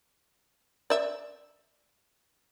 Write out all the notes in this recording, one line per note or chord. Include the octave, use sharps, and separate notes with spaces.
D5 E5